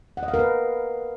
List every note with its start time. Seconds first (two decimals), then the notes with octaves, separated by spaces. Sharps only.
0.17 F#5
0.23 D#5
0.28 F5
0.34 A#4
0.39 B4